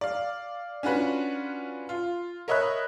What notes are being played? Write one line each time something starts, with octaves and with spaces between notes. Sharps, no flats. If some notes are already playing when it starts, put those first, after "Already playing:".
D5 F5
C#4 D4 F4 F#4 B4
F4
A#4 C#5 D#5 E5 B5 F#6